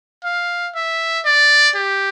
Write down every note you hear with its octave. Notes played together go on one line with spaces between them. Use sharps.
F5
E5
D5
G4